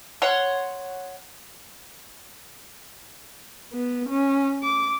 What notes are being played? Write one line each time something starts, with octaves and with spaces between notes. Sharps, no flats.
C#5 F#5 C6
B3
C#4
D6